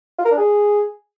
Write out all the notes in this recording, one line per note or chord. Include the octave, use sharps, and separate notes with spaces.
F4
A#4
D4
G#4